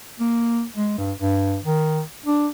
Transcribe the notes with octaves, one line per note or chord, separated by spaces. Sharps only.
A#3
G#3
G2
G2
D#3
D4